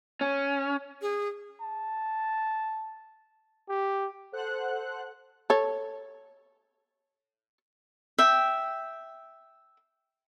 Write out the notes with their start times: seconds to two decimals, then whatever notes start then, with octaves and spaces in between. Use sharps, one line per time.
0.21 C#4
1.02 G#4
1.61 A5
3.69 G4
4.32 A4 C5 F#5 F#6
5.50 A4 C#5
8.19 E5 G5